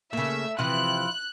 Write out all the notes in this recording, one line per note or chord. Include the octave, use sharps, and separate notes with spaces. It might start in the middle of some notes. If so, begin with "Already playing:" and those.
C#3 A3 A#3 E5
C3 E3 F3 E4 F4 F#6